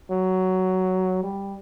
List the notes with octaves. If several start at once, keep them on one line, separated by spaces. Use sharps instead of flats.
F#3
G3